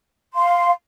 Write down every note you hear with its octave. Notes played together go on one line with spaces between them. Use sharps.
F5 C6